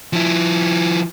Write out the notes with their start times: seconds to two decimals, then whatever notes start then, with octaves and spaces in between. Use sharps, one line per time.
0.13 F3 E4